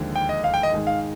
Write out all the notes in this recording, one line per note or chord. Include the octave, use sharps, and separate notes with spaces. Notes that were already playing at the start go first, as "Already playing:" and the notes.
Already playing: D#2 D3 F3 G#3
G5
D#5
F5
G5
D#5
G#2 D#3 G#3
F5